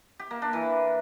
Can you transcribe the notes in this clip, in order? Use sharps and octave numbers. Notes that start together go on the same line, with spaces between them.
G4
A#3
D4
E3